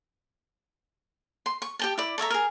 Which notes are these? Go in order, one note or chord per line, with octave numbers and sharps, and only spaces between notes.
C6
C#6
G4 G5 A5
E4 D5
A4 C#5 E5 A#5
G#4 A#4